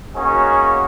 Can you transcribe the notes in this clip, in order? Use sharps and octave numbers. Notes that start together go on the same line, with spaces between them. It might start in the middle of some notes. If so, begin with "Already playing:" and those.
A#3 C#4 D#4 F#4 G#4